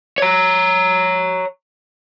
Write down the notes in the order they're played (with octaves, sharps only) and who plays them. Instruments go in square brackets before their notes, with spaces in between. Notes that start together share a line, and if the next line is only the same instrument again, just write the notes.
[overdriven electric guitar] C#5 A#5